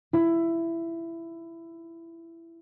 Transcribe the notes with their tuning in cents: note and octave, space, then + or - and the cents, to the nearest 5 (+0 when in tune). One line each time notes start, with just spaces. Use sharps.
E4 +15